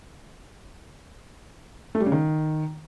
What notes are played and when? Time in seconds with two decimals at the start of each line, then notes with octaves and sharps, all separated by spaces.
1.95 A3
2.00 G3
2.06 C#3
2.12 D#3